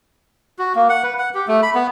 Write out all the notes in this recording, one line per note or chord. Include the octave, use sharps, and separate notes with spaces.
F#4
A#3
F#5
B4
F#5
G4
A3
B5
B3